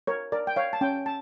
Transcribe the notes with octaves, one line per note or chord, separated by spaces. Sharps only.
A#4 C#5
A#4 D5
G5
C#5 F5
A5
C#4 G5
A5